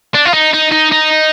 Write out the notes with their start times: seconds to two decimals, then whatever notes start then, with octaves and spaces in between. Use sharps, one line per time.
0.15 D4
0.25 F4
0.34 D#4
0.54 D#4
0.72 D#4
0.92 D#4